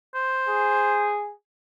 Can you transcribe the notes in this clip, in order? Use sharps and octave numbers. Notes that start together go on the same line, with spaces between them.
C5
G#4